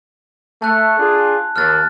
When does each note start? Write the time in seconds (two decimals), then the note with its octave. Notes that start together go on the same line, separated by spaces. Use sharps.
0.62 A3 A5 F#6
0.99 D4 F4 G#4
1.56 D#2 F6 F#6 A6